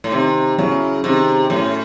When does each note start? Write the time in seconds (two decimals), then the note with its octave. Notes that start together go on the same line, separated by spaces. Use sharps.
0.04 A2
0.12 C3 D#3
0.58 C#3 F#3 C#4 E4
1.04 C3 D#3
1.50 A2 F#3 C#4 E4